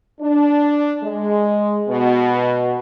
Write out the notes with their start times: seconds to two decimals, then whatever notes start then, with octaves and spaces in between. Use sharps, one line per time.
0.20 D4
1.03 G#3
1.88 B2